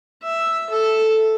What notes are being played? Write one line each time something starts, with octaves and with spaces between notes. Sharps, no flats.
E5
A4